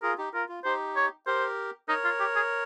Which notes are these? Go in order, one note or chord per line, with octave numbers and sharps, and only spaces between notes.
F4 G#4 A#4
D#4 G4
F4 A#4
F4
D#4 G4 C5
C#5
G4 A#4 C5
D#4 A#4 C#5
F4
G4
G#4